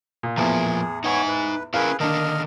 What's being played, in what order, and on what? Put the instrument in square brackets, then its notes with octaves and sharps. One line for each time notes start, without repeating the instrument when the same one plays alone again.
[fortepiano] A#2
[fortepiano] E2 A2 [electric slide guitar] F3 A#3 [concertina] G#4
[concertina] B3 C#5 [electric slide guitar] D#4 G5 G#5
[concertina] B4
[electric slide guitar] C#4 E4 A#4 [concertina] G#4 B4 [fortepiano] F5
[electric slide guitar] D3 D#3 [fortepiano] A#3 D4 [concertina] D#5 F6